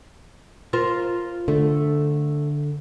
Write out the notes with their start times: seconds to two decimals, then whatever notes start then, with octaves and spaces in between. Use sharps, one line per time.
0.73 F4 A#4 C5
1.48 D3 A3